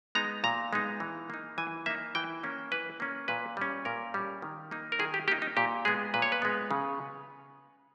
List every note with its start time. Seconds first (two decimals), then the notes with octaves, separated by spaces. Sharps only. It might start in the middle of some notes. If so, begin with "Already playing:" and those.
0.15 G#3 B3 D#4 A#5
0.44 A#2 A#5
0.73 G#3 B3 D#4
1.00 E3
1.30 A#3 D#4
1.58 E3 G#5
1.86 A#3 D#4 E5
2.15 E3 G5
2.43 A#3 C#4
2.72 E3 B4
3.00 A#3 C#4
3.28 A#2 B4
3.57 G3 C#4
3.85 A#2 A#4
4.14 G3 C#4
4.42 D#3
4.71 A#3 D#4
4.92 A#4
4.99 D#3 G#4
5.14 G4
5.28 A#3 G4
5.32 D#4
5.42 D#4
5.57 A#2 G4
5.85 G#3 B3 G#4
6.14 A#2 B4
6.22 C#5
6.32 B4
6.42 G#3 B3
6.71 C#3